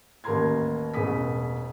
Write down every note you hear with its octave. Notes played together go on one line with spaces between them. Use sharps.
A1 D#2 A#4 A#5 C6 G#6
E1 A1 G#4 D#6 B6